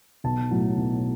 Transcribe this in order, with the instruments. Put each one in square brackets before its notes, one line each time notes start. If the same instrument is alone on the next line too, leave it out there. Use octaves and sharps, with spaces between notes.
[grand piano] B1 A5
A2 F#3
B1